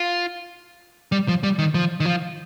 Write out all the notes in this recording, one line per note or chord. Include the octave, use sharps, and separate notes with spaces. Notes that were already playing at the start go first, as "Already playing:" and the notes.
Already playing: F4
G3
F3
G3
D#3
F3
D#3
F3